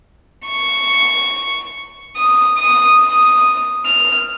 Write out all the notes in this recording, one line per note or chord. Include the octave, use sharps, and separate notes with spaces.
C#6
D#6
D#6
D#6
F6